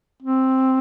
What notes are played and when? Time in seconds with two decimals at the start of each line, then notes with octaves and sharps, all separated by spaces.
0.23 C4